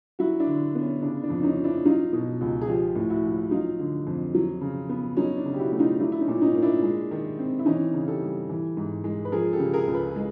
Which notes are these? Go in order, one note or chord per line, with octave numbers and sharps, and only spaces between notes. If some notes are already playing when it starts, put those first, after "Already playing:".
F#3 E4 F#4
D4 E4
D3
B3
C#4
C#3 D4
D4
F2
C#4 D#4
F3
D4 E4
F#3 D#4 F4
B2
C#2
G#4
F3 F4 G4
A2
E4 F#4
A#1
F#3 D#4 F4
D3
F2
F#3
C#3
B3
F#3 C#4 D#4
D4
C#3
G4
E4 F#4
A3
D#4 F4
F#3 D4 E4
E4
C#4 D#4
A#2
C#4 D#4
A#3
D4 E4
G#3
D#3
C4
E4
E3 C#4 D#4
C#3
G4 A4
G3
E3
G#2
G#3
B4
F3 G#4 A#4
G4 A4
C#3
G#4 A#4
C#2
A4 B4
G#3